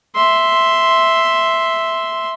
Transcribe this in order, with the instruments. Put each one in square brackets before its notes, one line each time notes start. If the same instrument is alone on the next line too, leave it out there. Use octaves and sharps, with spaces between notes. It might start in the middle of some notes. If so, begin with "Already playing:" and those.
[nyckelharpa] E5 C6